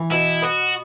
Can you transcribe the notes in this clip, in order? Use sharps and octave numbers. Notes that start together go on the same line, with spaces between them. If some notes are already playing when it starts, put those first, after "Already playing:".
Already playing: E3
B2 E4
B3 F#4